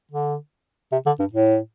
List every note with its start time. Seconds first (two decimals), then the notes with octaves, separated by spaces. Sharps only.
0.11 D3
0.92 C3
1.06 D3
1.20 G2
1.33 A2